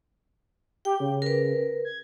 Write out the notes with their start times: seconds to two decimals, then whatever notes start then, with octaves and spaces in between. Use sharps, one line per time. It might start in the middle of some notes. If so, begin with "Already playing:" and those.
0.85 G4 G5
1.00 C#3
1.22 A#4 B4
1.85 G#6